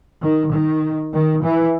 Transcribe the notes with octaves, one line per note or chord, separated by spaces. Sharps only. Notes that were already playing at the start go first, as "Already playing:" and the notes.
D#3
D#3
D#3
E3